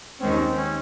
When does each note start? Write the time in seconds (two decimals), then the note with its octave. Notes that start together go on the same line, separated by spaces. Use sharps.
0.20 D#2 D#3 G#3 C4 C#4
0.56 C#4